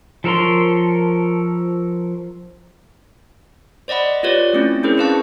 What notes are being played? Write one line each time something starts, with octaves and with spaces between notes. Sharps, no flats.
F3 A4 A#4 C#5 C6
C5 D5 D#5 F#5 B5
F4 G4 B4 C#5 D5
A3 C4 C#4 E4
C#4 D4 E4 G#4 A#4 C5
C4 C#4 B4 F5 A5 C#6